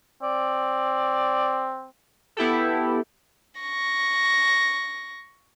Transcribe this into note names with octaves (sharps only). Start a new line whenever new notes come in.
C4 D5
B3 E4 G4 A4
C#6 A#6